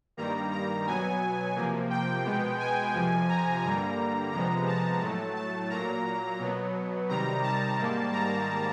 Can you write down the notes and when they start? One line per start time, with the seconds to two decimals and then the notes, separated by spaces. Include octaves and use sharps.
0.17 G2 D#3 G3 A#3 A#5
0.52 A#5
0.87 B2 F#3 B3 G#5
1.56 C3 F3 A#3
1.90 G5
2.24 B2 G#3 B3
2.59 G#5
2.94 F2 C3 F3
3.29 A#5
3.63 G2 D3 G3 A#3 A#5
4.32 F2 C3 F3 G#3 B3 A#5
4.67 A5
5.01 A2 F#3 A3
5.36 A5
5.70 A#2 F#3 A#3 A#5
6.40 B2 F#3 B3
7.09 C3 D#3 G3 A#5
7.43 A5
7.78 G#2 D#3 G3 A#3
8.13 A#5